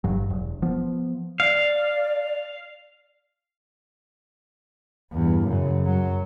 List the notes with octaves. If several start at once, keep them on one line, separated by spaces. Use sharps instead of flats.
G1 G2 F#3
E1
F3 B3
D5 F5
E2 G2
F#2 C#3
F#2 F#3